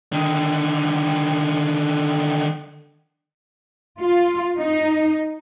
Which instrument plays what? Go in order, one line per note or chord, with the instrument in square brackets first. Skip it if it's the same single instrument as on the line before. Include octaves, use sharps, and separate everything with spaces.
[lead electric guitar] D3 D#3
[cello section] F4
D#4